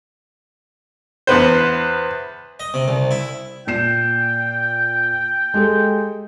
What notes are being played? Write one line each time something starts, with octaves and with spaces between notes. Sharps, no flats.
E2 B3 B4 C5
D#5
C3
C2
E4
A#2 G5 C7 E7
G#3 G4 A4